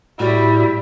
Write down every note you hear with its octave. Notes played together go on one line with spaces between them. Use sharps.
A2 G3 E4 F#4